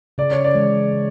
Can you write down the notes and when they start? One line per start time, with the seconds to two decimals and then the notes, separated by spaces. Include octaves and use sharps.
0.18 C#3 D5
0.32 C#5
0.44 D5
0.55 E3 G#3
0.93 C#3